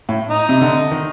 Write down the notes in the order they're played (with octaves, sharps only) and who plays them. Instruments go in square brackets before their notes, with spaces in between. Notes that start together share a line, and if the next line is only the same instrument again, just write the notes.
[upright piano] A2
[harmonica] D#4
[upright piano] C3
D3
D#3